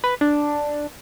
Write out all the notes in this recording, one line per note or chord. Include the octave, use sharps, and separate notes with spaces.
B4
D4